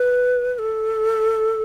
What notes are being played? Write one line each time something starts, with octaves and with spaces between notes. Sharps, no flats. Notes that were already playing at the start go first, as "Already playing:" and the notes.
Already playing: B4
B4
A4